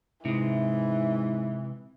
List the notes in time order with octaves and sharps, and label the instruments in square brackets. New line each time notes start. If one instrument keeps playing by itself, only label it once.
[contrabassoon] G#2 [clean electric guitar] C3 G#3 [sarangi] E3 [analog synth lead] E4